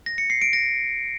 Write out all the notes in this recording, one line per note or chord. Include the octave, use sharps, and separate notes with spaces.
A#6
C#7
C7
D7
A#6